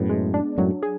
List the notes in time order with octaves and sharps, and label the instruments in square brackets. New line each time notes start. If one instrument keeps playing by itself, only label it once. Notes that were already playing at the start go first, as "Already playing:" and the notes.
Already playing: [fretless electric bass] F#2 A2 [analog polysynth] B3
[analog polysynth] G#3
D4
[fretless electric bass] F#2 A2 [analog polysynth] F#3
[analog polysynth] G#4